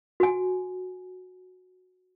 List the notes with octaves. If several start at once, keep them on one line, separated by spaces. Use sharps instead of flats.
F#4 G#5